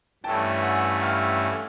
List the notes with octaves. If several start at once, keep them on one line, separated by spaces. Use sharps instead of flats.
G2 E3 A3 C#4 G5 A5
F#5 G#5
F5 G5